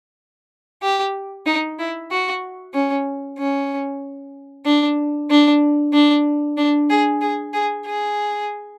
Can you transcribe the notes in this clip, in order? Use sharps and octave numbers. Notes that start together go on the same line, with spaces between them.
G4
D#4
E4
F#4
C#4
C#4
D4
D4
D4
D4
G#4
G#4
G#4
G#4